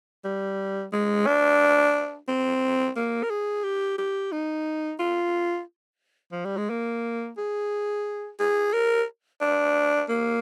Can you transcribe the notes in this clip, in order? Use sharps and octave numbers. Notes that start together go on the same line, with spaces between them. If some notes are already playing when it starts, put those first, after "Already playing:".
G3
G#3
D4
C4
A#3
A#4
G#4
G4
G4
D#4
F4
F3
G3
G#3
A#3
G#4
G#4
A#4
D4
A#3